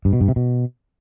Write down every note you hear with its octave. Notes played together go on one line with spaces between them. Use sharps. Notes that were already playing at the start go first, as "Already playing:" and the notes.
G2
B2
G2
C3
B2